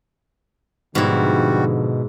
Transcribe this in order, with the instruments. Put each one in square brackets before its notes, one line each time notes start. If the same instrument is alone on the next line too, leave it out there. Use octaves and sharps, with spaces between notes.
[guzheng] G#2 E4 [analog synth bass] B2 [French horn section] D3 F3 [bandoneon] G3 F#4